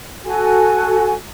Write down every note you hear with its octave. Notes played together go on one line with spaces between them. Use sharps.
F#4 A4 G#5